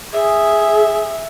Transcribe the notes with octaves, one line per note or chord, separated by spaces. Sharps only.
G#4 E5